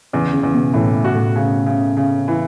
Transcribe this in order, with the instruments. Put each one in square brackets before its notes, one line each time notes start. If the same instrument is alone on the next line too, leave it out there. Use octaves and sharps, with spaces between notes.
[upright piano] E2 [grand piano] C#3
[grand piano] C#3
[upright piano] E2
[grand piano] B2
[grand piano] A2 [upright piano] E3
[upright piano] F#4
[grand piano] A2
[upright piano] C#3
C#3
C#3
E3